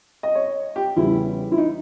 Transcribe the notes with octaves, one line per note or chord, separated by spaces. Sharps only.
D#5
C#5
G4
E2 C#3 G3 E4
E4
D#4